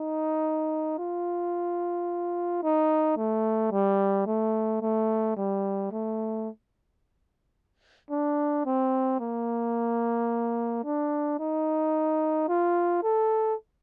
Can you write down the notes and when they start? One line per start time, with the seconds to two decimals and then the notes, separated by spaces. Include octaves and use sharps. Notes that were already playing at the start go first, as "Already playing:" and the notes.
Already playing: D#4
0.98 F4
2.63 D#4
3.17 A3
3.72 G3
4.27 A3
4.82 A3
5.37 G3
5.91 A3
8.11 D4
8.66 C4
9.20 A#3
10.85 D4
11.39 D#4
12.48 F4
13.03 A4